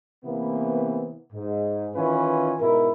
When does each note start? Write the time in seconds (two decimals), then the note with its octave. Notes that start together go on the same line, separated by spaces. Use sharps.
0.25 C3 E3 A#3 B3
1.33 G#2
1.95 D#3 E3 C#4 F4 B4
2.60 G#2 B2 E4 A#4